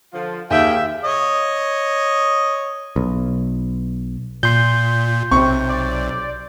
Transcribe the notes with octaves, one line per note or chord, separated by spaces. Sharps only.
D3 F3 F4
D#2 G#4 E5 F5 G5
C#5 D#5
B1
A#2 C6 G6
B1 C3 C4 C#6
D5